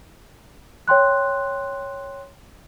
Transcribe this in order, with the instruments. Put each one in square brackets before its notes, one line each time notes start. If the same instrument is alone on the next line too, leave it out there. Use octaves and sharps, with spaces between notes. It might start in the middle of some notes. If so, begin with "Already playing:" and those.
[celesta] C#5 G5 C6 F#6